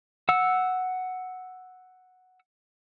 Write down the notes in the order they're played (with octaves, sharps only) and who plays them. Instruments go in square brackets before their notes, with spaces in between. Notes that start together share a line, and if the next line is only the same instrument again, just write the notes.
[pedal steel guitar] F#5 E6